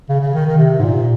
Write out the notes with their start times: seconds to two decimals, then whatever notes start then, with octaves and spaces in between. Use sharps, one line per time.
0.09 C#3
0.21 C#3
0.34 D#3
0.46 D#3
0.58 C3
0.79 G#2
0.83 A#2